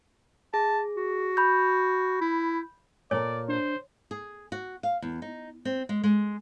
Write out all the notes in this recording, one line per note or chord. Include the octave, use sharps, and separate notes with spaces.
G#4 A5
F#4
B5 G6
E4
A#2 A4 A#4 C#5 D5
D4 C5
G#4
F#4
F5
E2
D#4
C4
G#3
G#3